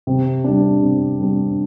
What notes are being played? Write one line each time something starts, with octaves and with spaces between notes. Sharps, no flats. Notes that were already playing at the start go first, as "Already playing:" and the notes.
C3
G3 D4
C3
G3 D4